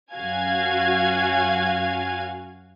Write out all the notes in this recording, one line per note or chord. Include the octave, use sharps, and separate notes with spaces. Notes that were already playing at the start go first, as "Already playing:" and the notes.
F#2 F#4 F5 G#5 G#6